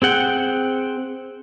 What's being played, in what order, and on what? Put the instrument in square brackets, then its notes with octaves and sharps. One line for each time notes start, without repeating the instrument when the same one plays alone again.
[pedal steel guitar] C4 G#4 F#5 G5